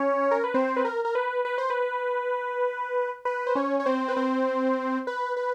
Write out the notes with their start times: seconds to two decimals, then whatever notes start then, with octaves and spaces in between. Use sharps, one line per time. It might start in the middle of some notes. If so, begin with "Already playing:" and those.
Already playing: C#4 C#5
0.31 A#4
0.44 B4
0.54 C4 C5
0.76 B4
0.85 A#4
1.05 A#4
1.15 B4
1.45 B4
1.58 C5
1.70 B4
3.25 B4
3.47 C5
3.55 C#4 C#5
3.80 C#5
3.86 C4 C5
4.08 B4
4.16 C4 C5
5.07 B4
5.37 B4